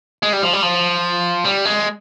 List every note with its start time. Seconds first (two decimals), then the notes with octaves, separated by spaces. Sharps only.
0.23 G#3
0.33 G3
0.42 F3
0.53 G3
0.63 F3
1.45 G3
1.65 G#3